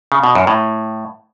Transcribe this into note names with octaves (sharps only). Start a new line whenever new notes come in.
C#3
B2
F#2
A2